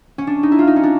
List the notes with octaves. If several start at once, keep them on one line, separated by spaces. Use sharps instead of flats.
C#4
D4
D#4
E4
F4
D#4
C#4
D4